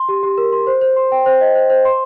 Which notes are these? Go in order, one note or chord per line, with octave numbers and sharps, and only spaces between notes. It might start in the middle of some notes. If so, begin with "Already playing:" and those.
Already playing: C6
G4
G4
A#4
C6
C5
C5
C6
G5
C5
D#5
C5
C5
C6